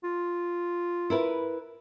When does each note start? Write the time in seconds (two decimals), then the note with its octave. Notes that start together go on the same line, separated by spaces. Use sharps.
0.04 F4
1.10 E4 A#4 B4